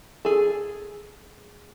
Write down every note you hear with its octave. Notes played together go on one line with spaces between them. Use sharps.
G#4 A4